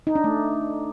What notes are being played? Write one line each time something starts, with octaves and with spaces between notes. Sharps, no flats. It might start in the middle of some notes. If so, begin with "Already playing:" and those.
D#4
D4
A3